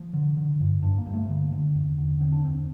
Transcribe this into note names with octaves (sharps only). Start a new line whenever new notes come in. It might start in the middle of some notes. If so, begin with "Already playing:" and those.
Already playing: F3
D3
D3
G2
G2 D4
A#3
G2
A3
D3 A#3
D3
E2
D3
D3 C4
D4
E2 C4